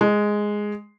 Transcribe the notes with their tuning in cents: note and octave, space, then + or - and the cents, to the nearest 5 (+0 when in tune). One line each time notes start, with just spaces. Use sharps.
G#3 +0